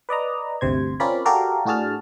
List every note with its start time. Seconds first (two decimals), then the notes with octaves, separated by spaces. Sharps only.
0.09 B4 D5 D#5 A#5
0.61 G1 D2 C3 C5 G#6
1.00 C4 C#4 F4 A#4 D5 B5
1.25 F#4 G4 A4 A#4 D5 F5
1.65 A2 D4 F#4 G#4 A5 F6